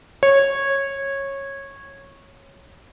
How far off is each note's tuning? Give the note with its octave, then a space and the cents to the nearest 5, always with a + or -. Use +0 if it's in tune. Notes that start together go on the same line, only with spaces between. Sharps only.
C#5 -15